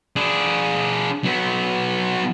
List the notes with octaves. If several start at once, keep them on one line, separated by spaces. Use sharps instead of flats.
D4 G#4
F#3 B3